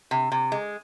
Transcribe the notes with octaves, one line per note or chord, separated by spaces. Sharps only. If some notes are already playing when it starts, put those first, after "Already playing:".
C3
C3
G#3